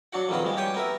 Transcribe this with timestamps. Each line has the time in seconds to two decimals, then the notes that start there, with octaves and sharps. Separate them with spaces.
0.13 F#3 D4 F#4 F#5
0.29 A#1 F2 D#3 B3 C6
0.45 G3 G#3
0.57 G4 C#5 G5 G#5
0.74 B3 A#4 E5